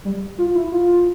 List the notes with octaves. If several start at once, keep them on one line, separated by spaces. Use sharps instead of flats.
G3
F4
E4
F4